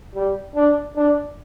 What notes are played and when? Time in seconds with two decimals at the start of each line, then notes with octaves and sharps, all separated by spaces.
0.15 G3
0.55 D4
0.96 D4